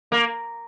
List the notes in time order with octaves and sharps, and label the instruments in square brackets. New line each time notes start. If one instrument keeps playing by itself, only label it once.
[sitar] A#3